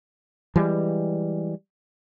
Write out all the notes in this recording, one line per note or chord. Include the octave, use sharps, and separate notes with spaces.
E3 G3 G#3